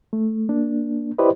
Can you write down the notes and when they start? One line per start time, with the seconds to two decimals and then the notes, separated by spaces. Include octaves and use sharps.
0.13 A3
0.49 A#3 D4
1.18 E4 G4 B4 C5 D5 D#5